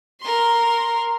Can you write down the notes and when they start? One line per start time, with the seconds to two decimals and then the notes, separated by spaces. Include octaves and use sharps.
0.21 A#4 C6